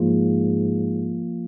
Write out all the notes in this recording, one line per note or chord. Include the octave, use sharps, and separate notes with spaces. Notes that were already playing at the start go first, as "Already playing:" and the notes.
Already playing: G#2 F3 A#3 F4